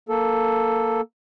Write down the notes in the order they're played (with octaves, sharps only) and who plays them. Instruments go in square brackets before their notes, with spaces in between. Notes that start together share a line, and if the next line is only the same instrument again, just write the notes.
[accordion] A#3 A4